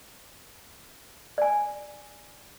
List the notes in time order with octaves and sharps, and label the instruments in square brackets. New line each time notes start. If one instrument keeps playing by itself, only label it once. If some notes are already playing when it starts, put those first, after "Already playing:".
[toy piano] D5 G#5